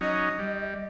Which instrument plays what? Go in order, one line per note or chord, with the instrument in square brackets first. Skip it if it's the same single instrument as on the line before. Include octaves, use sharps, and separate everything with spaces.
[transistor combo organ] F#3 C#4 D#4 [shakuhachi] D#5
[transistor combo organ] G3